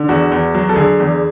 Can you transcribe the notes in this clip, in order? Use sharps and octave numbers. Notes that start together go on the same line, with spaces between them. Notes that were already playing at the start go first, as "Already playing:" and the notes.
Already playing: D3
E2 F#4
E2
F#3
A4
D3 G#4
E2